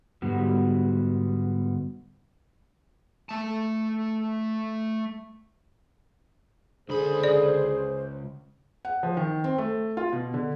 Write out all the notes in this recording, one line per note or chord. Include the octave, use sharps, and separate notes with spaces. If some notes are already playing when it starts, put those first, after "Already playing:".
G#2 D3 G3 B3 F#4
A3 A5
C#2 D3 G#4 C5 B5
D5
F#5
F3
D#3
C4
A3
F4
B2
D3